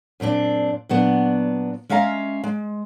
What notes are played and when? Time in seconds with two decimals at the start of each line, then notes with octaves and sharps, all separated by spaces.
0.20 F#2 A#2 C4 D4
0.89 A#2 F#3 B3 D4
1.89 G#3 C#4 E5 F5 A#5
2.44 G#3